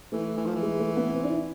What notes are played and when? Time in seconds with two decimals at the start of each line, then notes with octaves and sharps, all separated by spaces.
0.12 E3 A3
0.37 E3
0.46 F3
0.55 E3
0.62 G#3
0.79 A3
0.97 B3
1.13 C4
1.23 D4
1.30 E4